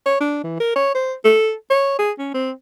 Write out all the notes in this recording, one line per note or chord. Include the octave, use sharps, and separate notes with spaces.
C#5
D4
E3
A#4
C#5
C5
A4
C#5
G#4
C#4
C4